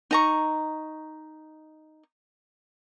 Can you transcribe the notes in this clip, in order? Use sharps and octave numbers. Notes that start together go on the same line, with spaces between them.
D#4 A#5 C#6